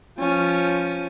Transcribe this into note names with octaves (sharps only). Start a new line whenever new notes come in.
F3 C#4